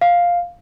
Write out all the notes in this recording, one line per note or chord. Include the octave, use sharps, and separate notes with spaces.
F5